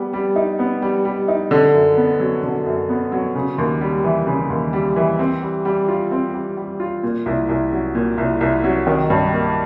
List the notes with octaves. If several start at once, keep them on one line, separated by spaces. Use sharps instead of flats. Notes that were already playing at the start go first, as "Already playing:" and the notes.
Already playing: G3 B3
G3
D#4
B3
G3
G3
D#4
D3
F#2
B3
F#3
D3
F#2
B3
F#3
C#3
D#2
G3
E3
C#3
D#2
G3
E3
C4
G3
G3
F4
C4
G3
G3
F4
A#2
C2
C2
F#3
A#2
C2
C2
F#3
D#3
G2
A#3